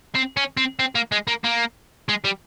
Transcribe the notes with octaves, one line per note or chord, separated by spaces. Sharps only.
C4
C#4
C4
C4
A#3
G#3
A#3
A#3
G#3
G3